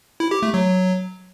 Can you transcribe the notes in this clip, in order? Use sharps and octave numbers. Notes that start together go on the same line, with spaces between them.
E4
G4
A3
F#3